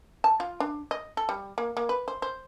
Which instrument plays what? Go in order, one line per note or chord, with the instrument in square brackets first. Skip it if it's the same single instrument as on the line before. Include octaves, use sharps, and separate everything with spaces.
[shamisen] A5
F4
D4
D#5
A4
G3
A#3
A#3
B4
C5
C5